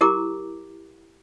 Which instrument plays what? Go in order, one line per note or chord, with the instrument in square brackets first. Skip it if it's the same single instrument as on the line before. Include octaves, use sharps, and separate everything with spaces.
[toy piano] E4 G4 A#4 A#5 D6